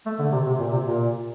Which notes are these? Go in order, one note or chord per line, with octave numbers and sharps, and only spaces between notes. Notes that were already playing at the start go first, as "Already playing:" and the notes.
A3
D3
C3
C3
A#2
C3
A#2